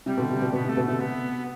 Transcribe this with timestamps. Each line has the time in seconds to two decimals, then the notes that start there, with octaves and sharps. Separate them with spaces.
0.06 C3 G3
0.17 B2 D3
0.29 C3
0.42 B2
0.53 B2 B3
0.64 C3
0.69 A3
0.77 B2 D3
0.85 C3 A3
1.00 B3